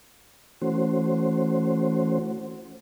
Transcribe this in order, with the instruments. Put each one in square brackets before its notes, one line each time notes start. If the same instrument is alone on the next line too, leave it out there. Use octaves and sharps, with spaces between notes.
[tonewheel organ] E3 A3 C#4 F#4 C5